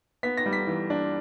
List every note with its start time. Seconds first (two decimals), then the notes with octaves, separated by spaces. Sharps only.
0.23 B3 B6
0.37 A#6
0.46 G3
0.53 B6
0.67 E3
0.90 D4